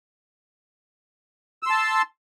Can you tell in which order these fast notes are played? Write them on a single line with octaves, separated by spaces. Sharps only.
E6 C6 A5